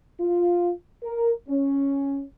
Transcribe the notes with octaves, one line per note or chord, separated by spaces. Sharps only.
F4
A#4
C#4